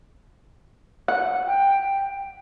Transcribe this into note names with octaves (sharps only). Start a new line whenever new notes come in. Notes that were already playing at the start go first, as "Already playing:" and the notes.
F#5
G5